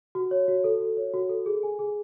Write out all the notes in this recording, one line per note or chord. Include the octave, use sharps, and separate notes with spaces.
F#4
C#5
F#4
A4
F#4
C#5
F#4
A4
G#4
G#5
G#4